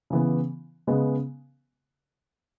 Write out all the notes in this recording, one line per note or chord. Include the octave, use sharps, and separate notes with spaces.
C#3 E3 B3
C#3 G#3 B3